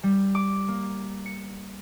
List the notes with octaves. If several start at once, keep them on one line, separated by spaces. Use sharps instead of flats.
G3
D6
A#3
C#7